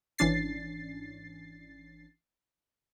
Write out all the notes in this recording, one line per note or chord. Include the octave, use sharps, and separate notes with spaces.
G#1 E3 C#4 D4 A6 C7